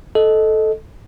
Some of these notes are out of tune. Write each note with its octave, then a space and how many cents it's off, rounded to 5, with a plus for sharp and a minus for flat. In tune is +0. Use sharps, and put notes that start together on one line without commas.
A4 -10 D#5 +0